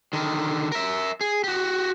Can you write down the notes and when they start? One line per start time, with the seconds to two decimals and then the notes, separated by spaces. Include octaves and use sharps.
0.13 D3 D#3
0.72 A#4 E5
1.21 G#4
1.44 F#4 G4